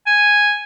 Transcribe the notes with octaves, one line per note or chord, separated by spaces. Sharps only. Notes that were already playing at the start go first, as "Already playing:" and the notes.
G#5